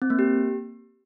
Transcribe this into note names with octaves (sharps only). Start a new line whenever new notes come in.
C4
A#3
G4